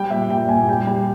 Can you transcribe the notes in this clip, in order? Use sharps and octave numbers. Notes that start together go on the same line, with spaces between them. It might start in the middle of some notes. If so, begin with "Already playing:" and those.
Already playing: G3 G5
A#2 E5
A#2 G5
A#2 G#5
G3 G5
G3 G5